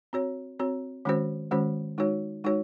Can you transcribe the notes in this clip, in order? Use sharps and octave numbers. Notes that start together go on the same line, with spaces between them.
C4 F#4 C#5
C4 F#4 C#5
D#3 G#3 C#4 F#4 C5
D#3 G#3 C#4 F#4 C5
G#3 D#4 F#4 C#5
G#3 D#4 F#4 C#5